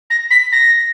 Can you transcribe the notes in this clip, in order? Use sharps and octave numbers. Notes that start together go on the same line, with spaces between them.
A#6
B6
A#6